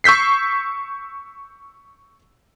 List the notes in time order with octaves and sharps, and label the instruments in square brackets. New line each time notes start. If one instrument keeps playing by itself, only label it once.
[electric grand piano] C#6 E6 G6 B6 C7